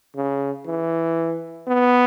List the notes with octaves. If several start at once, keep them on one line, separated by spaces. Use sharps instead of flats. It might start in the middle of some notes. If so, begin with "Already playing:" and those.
C#3
E3
B3